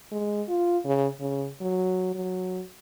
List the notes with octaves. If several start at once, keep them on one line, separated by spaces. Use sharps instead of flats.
G#3
F4
C#3
C#3
F#3
F#3